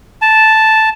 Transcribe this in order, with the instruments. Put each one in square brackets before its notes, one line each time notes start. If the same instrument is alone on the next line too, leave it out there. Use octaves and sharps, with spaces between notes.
[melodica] A5